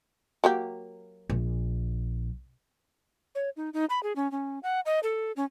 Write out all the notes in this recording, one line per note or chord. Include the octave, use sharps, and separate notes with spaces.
F#3 A#3 G4
A#1
C#5
D#4
D#4
B5
G#4
C#4
C#4
F#5
D#5
A4
C#4